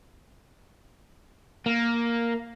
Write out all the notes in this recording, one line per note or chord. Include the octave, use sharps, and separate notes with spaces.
A#3